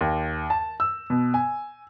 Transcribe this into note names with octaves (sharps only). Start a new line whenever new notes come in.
D#2
A5
E6
B2
G#5